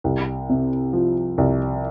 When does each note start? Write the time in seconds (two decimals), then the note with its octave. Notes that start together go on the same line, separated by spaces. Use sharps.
0.04 C2
0.50 C3
0.93 F3
1.38 C2